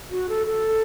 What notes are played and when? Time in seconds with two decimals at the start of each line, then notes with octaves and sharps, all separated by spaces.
0.11 F#4
0.29 A4
0.46 A4